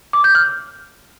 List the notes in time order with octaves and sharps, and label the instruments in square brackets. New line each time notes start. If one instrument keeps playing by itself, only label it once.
[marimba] D6
G6
F6